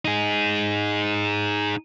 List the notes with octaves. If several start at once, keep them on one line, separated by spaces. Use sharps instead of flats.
D#4 G#4